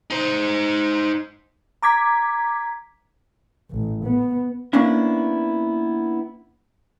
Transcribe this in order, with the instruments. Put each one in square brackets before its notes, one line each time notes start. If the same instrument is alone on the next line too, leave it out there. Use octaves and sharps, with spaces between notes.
[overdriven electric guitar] D#4 C5
[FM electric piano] A#5 D6 G#6 B6
[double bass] A1
B3
[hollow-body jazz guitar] A#3 B3 C#4 D4 E4